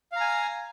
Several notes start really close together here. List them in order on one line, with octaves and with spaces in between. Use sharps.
F5 A#5 G#5